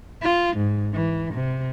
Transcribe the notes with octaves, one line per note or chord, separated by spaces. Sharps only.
F4
G#2
E3
C3